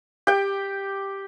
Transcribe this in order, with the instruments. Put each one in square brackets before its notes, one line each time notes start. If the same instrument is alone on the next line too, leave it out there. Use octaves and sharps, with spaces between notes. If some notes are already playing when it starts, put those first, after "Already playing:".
[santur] G4 G5